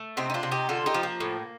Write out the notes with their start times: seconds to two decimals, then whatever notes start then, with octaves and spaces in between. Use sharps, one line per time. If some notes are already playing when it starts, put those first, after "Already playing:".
Already playing: A3
0.17 C3 C4 D#4
0.30 D#4
0.34 D4 F4
0.43 C3
0.52 D#4 G4
0.69 D3 F4 A4
0.86 D#4 G4
0.94 F3
1.03 A#3
1.20 A2